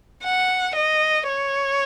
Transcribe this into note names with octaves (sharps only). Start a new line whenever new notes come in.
F#5
D#5
C#5